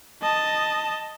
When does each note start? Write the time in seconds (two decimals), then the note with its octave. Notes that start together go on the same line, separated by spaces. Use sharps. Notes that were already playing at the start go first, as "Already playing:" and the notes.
0.22 D#5 A5